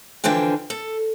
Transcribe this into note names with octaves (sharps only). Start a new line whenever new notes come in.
D3 E3 F3 D4 G5
A4